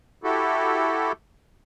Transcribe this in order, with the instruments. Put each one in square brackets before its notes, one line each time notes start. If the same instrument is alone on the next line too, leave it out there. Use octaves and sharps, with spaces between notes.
[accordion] E4 F#4 G4 A4